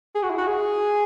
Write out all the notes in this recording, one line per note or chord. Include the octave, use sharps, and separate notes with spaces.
G#4
F#4
E4
F#4
G#4